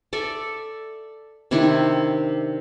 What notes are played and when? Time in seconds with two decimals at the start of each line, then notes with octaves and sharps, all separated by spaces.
0.13 A4 D5 E5
1.51 C3 D#3 D4 E4